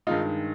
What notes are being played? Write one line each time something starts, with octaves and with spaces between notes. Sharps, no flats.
G2 D#3 G#3 D#4 F4